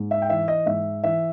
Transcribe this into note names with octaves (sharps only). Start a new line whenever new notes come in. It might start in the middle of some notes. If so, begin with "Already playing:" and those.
Already playing: G#2
E5
G5
E3 E5
D#5
G#2 E5
E3 E5